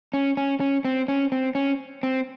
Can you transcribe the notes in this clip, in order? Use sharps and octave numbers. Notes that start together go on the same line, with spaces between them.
C#4
C#4
C#4
C4
C#4
C4
C#4
C4